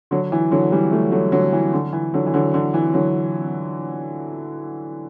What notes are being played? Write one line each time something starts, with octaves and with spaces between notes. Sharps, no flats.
D3 F#3
E3
D3 F#3
E3 G3
F#3 A3
F#3 A3
D3 F#3
E3
D3
E3
D3 F#3
E3
D3 F#3
D3
E3
D3 F#3